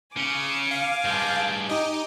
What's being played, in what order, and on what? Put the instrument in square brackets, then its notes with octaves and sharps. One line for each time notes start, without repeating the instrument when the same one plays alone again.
[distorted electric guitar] C#3 [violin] G#5 D6 [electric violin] C#7 [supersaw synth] D#7
[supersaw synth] F5
[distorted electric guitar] G2 G#3 [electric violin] A5 G6
[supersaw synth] D#4 D#5 [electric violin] G4